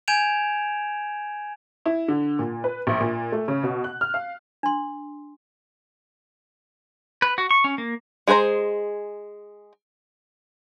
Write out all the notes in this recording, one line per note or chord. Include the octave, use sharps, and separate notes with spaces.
G#5 G6 G#6 D7 E7 F7
E4
D3
A#2
B4
A#1
A#2
A3
C#3
B2
F#6
F6
F5
D4 C6
B4
F#4
C#6
C#4
A#3
G#3 G#4 B4 C5 A#5